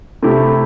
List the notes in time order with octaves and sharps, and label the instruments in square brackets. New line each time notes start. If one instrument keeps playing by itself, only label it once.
[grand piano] C3 A3 E4 G4